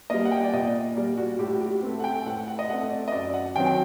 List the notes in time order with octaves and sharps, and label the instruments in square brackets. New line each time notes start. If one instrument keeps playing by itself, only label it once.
[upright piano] G3 A#3 D#5
F#5
G5
D5
A#2 D#5
G3 A#3 D5
F#4
A2 G4
F#4
G4
A3 C4
F#5
G5
A2 F#5
F#5
D#5
A3 C4 F#5
D5
D#5
F#2 D5
F#5
D#3 F#3 C4 G5
G5